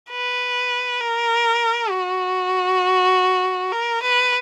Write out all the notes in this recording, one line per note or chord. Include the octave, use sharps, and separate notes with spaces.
B4
A#4
F#4
A#4
B4